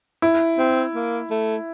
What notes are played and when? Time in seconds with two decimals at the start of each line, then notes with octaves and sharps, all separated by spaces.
0.22 E4
0.58 C4
0.95 A#3
1.31 A3